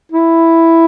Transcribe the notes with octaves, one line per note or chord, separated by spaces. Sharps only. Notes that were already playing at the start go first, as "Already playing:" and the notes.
E4